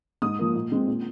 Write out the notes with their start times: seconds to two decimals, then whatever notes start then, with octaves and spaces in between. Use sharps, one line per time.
0.22 G#2 D#6
0.39 F3 A#3
0.55 A#2
0.72 G#3 C4
0.87 A#2